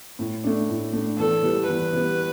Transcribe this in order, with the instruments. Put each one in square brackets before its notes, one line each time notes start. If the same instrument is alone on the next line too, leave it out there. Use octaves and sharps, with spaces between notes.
[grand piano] A2
A3 D4
A2
A3 D4
[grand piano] E2 [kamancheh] A4
[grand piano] E3 G3 B3
[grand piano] E2 [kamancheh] B4
[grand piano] E3 G3 B3